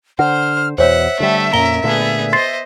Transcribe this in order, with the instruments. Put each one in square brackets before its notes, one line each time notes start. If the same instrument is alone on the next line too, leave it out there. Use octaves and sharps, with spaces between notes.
[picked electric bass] D3 [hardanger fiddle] C5 [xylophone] F#5 [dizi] F6
[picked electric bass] E2 B2 [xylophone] C5 C#5 [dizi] E5 [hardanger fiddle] F#5
[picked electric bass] D3 G3 [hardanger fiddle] A3
[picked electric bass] F2 A#2 A#3 [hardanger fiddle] C#4 A#4 [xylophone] A#5 G7
[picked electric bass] A#2 D3 A3 [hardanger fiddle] B3 G#4
[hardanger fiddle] C5 D#5 [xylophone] C6 A6 C7